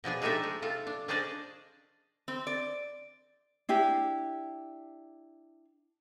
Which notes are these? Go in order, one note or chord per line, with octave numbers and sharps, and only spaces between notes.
B2 F3 D4 G#4
G#3 A3 D#4 G4 A4 E5
G#3
C3 F4 A4
D4
C#4 D4 G#4 C5 D5 D#5
C4
D5
D4 E4 G4